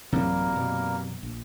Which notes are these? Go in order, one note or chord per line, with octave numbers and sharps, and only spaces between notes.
A1 F#2 C3 E3 F#3 G3 A#3 A#4
F#2 B2
A#1